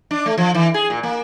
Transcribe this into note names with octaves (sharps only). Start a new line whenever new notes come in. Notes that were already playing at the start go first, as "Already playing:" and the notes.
D4
A3
F3
E3
G#4
A#2
A#3